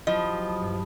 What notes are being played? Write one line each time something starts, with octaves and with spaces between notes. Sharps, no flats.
F3 F#3 E4 G4 D#5 A5 B5 D#6
G2